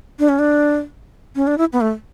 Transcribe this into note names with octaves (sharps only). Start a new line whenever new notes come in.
D4
C#4
D4
C#4
D4
E4
B3
A3